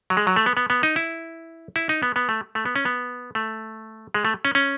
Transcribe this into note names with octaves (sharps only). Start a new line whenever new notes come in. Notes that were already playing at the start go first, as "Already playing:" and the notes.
F#3
G#3
F#3
A3
B3
B3
B3
D#4
E4
E4
D#4
B3
B3
A3
A3
B3
C#4
B3
A3
G#3
A3
C#4
C#4